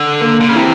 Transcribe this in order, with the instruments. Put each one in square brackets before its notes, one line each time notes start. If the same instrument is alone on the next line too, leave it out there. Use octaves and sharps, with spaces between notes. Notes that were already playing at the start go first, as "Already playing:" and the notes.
Already playing: [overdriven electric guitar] D3
[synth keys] A#3
[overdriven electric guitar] D3
C#3
[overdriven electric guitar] C3 [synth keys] E3